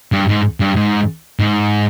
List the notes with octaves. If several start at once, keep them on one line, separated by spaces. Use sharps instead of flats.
G2
G#2
G2
G#2
G#2